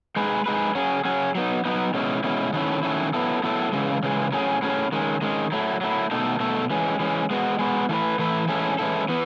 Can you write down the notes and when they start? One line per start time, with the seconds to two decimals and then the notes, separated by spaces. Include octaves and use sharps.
0.16 G#3 D#4 G#4 B4
0.46 G#3 D#4 G#4 B4
0.75 F#3 C#4 G#4
1.05 F#3 C#4 G#4
1.35 F#3 B3 D#4
1.65 F#3 B3 D#4
1.94 B2 G#3 C#4 E4
2.24 B2 G#3 C#4 E4
2.53 D#3 F#3 A3 C#4 E4
2.83 D#3 F#3 A3 C#4 E4
3.14 F#3 B3 E4 A4
3.43 F#3 B3 E4 A4
3.73 C#3 E3 G#3
4.03 C#3 E3 G#3
4.32 A2 F#3 C#4 G#4
4.62 A2 F#3 C#4 G#4
4.92 D#3 G#3 C#4
5.22 D#3 G#3 C#4
5.52 F#3 A3 E4
5.81 F#3 A3 E4
6.11 B2 A3 D#4 A4
6.40 B2 A3 D#4 A4
6.70 E3 G#3 C#4
7.00 E3 G#3 C#4
7.30 G#3 B3 F#4
7.59 G#3 B3 F#4
7.89 E3 A3 E4 B4
8.19 E3 A3 E4 B4
8.48 E3 G#3 C#4 E4 A4
8.79 E3 G#3 C#4 E4 A4
9.08 E3 B3